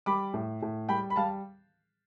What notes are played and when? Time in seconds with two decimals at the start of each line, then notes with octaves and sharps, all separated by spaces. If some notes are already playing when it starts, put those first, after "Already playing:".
0.06 G3 B5 D6
0.34 A2
0.62 A2
0.89 G3 G5 B5
1.10 B5
1.16 G3 F5 A5